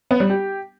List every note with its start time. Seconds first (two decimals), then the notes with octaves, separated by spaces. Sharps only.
0.11 B3
0.20 G3
0.30 G4